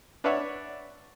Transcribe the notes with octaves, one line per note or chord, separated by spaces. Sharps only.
D4 B4 C#5 D5 E5 F#5